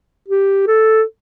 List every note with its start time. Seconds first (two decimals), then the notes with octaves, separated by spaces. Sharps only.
0.28 G4
0.67 A4